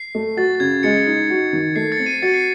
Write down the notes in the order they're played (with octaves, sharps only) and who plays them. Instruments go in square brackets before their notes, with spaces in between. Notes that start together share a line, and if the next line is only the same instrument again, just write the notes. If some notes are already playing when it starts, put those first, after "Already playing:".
Already playing: [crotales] C7
[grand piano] A3
[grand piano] F#4 [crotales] A6
[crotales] A6
[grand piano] C#3 [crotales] G#6
[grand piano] G#3 [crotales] A6 C#7
[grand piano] D#4
F#4
D#3
[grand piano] A3 [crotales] C7
[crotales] A6 C#7
[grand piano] C4
[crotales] C7 D#7
[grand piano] F#4 [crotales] A6 C#7
[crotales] C7